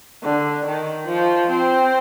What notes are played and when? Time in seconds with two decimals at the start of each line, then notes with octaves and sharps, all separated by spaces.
0.23 D3
0.66 D#3
1.08 F3
1.50 C4